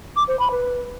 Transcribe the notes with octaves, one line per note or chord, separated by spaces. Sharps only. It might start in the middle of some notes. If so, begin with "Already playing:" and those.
D6
C5
B5
B4